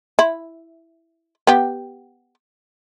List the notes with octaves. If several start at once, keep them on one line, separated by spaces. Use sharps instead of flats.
E4
B3 G4